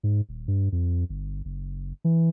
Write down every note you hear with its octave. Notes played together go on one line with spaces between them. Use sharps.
G#2
D#1
G2
F2
G1
F#1
E3